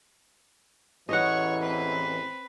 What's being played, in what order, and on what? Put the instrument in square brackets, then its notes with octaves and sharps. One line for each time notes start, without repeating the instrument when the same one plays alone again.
[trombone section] A1 E2 E3 [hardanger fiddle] C#5 C#6 [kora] D#5 F#5
[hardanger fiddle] C4 B4